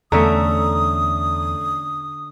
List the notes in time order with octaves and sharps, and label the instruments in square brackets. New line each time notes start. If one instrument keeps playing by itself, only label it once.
[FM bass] E2 [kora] D3 C#4 E5 [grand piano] A3 A#5 [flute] D#6